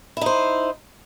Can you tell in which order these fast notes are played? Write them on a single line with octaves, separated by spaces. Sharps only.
E4 D#4 C5